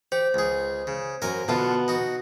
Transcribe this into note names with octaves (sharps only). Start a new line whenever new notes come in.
G4 C5
C#2 G#4
C#3
F#2 F#3 A#4 G#5
B2 D3 B3 F4 A5
D#4 F#4